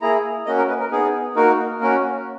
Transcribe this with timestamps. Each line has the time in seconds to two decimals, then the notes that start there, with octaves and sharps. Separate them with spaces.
0.02 A#3 E4 G#4 A#5
0.46 A#3 C#4 F#4 D#5
0.58 A#4
0.69 B4
0.80 A#4
0.91 B3 D#4 G#4
1.36 A#3 D#4 F#4 A#4
1.80 A#3 C#4 F#4 A#4